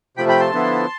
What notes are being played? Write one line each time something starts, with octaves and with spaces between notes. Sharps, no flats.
C3 F3 A3 G5 B5
G5 B5
A5 C6
D3 F3 B3 E4